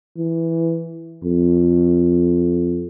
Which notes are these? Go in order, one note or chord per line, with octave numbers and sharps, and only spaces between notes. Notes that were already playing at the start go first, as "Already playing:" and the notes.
E3
F2